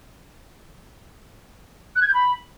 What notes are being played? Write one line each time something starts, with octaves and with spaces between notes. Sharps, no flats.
F#6
G#6
G6
B5